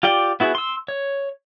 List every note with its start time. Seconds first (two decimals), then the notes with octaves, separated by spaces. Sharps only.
0.03 F4 G4 D5 G5
0.40 B3 E4 F#4 G#4
0.55 C6 E6
0.88 C#5